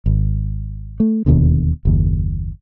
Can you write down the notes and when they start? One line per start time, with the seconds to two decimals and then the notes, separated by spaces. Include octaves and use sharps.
0.06 G#1
1.00 A3
1.26 E1 D#2 B2 D3
1.85 F#1 D#2